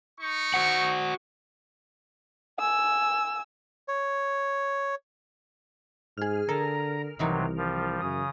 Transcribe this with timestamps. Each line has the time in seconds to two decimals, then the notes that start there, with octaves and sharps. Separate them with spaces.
0.21 D#4 C#6
0.54 F#4 C5 F#5
2.59 G#5 E6
3.88 C#5
6.18 G#2 G#4 F6
6.49 D3 A4 A#4 A#5
7.19 C2 C3 D#3 E3 F#3 D#4
7.57 F3 G3
8.01 F#2 C#3 D#6